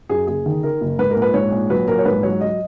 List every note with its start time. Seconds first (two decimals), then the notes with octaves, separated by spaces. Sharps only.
0.09 F#2 G#4
0.27 F#1 G#4
0.46 D#3
0.63 D#3 A#4
0.81 F#1
0.99 G#2 B4
1.11 A#4
1.16 A#1
1.22 B4
1.34 G#2 C#5
1.51 A#1
1.70 F#3 B4
1.88 A#1 A#4
1.99 C#5
2.05 G#2 B4
2.23 F#3 C#5
2.41 F#3 D#5